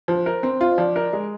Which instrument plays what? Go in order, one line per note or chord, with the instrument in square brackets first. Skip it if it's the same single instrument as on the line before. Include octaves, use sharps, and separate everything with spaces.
[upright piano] F3 [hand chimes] C5
[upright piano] A#4
[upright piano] C4 [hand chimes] C5
[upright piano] F4
[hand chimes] D#5
[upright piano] F3 [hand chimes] D5
[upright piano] A#4
[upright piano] G#3 [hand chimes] D#5